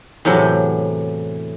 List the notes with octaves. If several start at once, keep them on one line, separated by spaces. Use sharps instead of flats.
E2 A2 C3 F#3